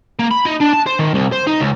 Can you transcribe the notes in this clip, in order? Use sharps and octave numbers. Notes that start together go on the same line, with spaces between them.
A#3
B5
D#4
D4
A5
C5
D#3
C2
C5
D#4
C#2